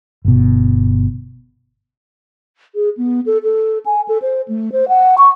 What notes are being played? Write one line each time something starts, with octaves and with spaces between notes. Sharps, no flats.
G1 B2
G#4
B3
A4
A4
G#5
A4
C5
A3
C5
F#5
C#6